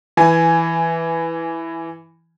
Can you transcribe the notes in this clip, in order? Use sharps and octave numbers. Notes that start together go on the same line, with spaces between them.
E3 G#5